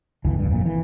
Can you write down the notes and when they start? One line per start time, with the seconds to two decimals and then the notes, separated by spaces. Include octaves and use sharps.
0.25 G1 C#2 E3
0.39 F1 D2 G2
0.51 F2 A#2
0.65 E3